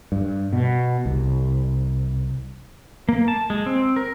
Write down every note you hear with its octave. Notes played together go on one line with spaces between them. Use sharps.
G2
B2
C2
A#3
A5
G#3
C4
A#4